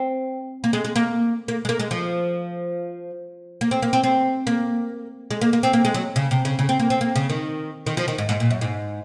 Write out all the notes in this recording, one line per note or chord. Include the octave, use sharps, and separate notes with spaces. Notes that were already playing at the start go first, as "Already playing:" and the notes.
Already playing: C4
A#3
G#3
G#3
A#3
A#3
G#3
A#3
G#3
F3
A#3
C4
A#3
C4
C4
A#3
G#3
A#3
A#3
C4
A#3
G#3
F#3
C#3
C3
C#3
C#3
C4
A#3
C4
A#3
C#3
D#3
D#3
F3
D#3
G#2
G#2
A#2
F#2
G#2